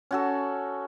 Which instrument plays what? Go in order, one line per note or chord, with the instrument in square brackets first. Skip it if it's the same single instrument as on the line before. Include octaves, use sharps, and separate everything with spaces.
[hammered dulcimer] C#4 F#4 A4